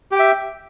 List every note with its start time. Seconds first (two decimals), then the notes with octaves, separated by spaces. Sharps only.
0.12 G4
0.15 G5
0.19 E5